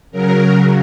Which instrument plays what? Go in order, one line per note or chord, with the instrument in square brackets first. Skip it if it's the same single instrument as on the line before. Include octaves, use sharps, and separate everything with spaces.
[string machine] C#3 F#3 A#4